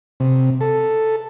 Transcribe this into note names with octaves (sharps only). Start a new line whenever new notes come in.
C3
A4